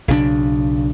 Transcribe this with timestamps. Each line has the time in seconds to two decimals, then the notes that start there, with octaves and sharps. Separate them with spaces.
0.08 B1 C#3 C#4 D4